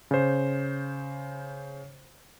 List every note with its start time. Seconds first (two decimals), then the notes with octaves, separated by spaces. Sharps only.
0.11 C#3 C5